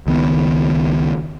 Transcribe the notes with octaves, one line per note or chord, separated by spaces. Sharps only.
C#2 D#3 B3